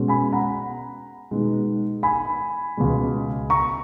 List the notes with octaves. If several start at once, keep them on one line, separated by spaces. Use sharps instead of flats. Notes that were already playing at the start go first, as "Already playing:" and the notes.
Already playing: B2 G#3 C#4
G#5 B5
F#5 A#5
B2 G#3 B3 D#4
G#5 B5
C#2 B2 G#3
A#5 C#6